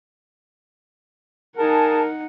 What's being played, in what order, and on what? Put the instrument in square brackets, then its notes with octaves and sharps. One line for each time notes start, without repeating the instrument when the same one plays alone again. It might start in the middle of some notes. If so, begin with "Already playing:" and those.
[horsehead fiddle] D#4 F#5 [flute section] G#4 A5 [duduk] A#4